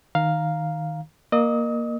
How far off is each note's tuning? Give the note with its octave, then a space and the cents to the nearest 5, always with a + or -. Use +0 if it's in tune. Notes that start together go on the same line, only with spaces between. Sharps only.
D#3 +0 F5 +0 A#5 +0
A#3 +5 D#5 -30 D#6 +40